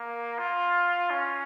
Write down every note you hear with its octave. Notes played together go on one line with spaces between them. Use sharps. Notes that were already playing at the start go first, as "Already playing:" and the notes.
Already playing: A#3
F4
C#4